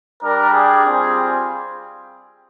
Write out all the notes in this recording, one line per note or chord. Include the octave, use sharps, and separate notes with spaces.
G3 D4 G4 A#4
G#4
G3 C4 F4